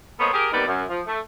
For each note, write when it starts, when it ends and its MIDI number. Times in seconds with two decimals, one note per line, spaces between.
0.19 0.29 58
0.19 0.29 59
0.19 0.29 69
0.19 0.29 72
0.19 0.29 73
0.19 0.29 75
0.33 0.49 67
0.33 0.49 68
0.33 0.49 70
0.52 0.62 39
0.52 0.62 48
0.52 0.62 51
0.52 0.62 55
0.52 0.62 59
0.52 0.62 74
0.67 0.84 42
0.89 1.01 53
1.07 1.18 57